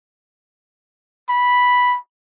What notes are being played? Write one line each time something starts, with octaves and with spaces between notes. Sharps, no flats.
B5